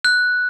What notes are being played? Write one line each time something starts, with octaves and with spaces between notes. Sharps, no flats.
F#6